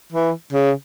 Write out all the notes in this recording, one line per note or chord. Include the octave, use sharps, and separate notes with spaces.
E3
C#3